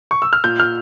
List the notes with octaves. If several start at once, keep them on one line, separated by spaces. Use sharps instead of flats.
C#6
E6
F6
A#2 G6
F6